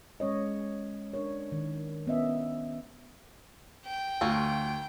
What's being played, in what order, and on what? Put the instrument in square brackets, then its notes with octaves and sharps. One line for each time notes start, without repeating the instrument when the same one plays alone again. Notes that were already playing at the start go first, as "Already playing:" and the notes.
[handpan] G#3 C#4 C#5 D#5
D4 A#4 C#5
D#3
B3 C#4 D#5 E5
[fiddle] G5
[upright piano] D2 [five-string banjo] F4 F#4 A4